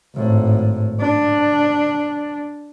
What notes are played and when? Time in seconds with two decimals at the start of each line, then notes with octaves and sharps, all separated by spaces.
0.16 G#1 A2
1.01 D4